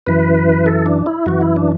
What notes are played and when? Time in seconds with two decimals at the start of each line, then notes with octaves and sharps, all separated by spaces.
0.06 F#2 E3 B4
0.66 A4
0.86 D4
1.06 E4
1.26 F#2 E3 F#4
1.41 E4
1.56 D4